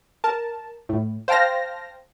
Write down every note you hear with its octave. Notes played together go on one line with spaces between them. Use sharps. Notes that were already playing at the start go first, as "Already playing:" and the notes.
A#4 A5
A2
C5 F5 G5 A5 F6 A#6